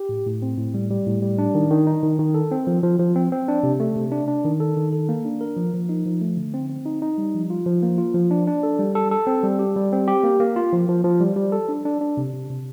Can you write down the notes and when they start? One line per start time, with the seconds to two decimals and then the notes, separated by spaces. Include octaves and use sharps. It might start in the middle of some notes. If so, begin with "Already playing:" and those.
Already playing: G4
0.09 A2
0.26 A2
0.42 C4
0.57 A2
0.74 G3
0.91 G3
1.06 A2
1.22 G3
1.39 D4
1.55 D#3
1.70 D#3
1.87 D#4
2.03 D#3
2.19 D#3
2.34 A4
2.51 C4
2.67 F3
2.83 F3
2.99 F3
3.16 C4
3.32 C4
3.48 D4
3.63 C3
3.80 A3
3.96 C3
4.12 D4
4.28 D4
4.44 D#3
4.60 A4
4.77 D#3
4.93 A4
5.09 A#3
5.25 D4
5.41 A#4
5.57 F3
5.74 F3
5.89 D#4
6.06 F3
6.21 A3
6.37 D3
6.54 C4
6.69 C4
6.85 D#4
7.02 D#4
7.18 G3
7.34 F3
7.50 F4
7.66 F3
7.83 A#3
7.98 F4
8.14 F3
8.31 D4
8.47 D4
8.63 A4
8.79 G3
8.95 A4
9.11 A4
9.27 C4
9.43 G3
9.59 G4
9.76 G3
9.92 C4
10.08 G4
10.23 A#3
10.40 A#3
10.56 F4
10.73 F3
10.89 F3
11.04 F3
11.21 G3
11.36 G3
11.52 A4
11.69 D4
11.85 D4
12.01 D4
12.17 C3
12.33 C3
12.50 C3